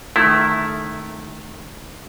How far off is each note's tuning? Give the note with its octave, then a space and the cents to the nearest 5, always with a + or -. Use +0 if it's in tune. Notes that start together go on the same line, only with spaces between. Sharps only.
D#3 -20 A3 -15 E4 +0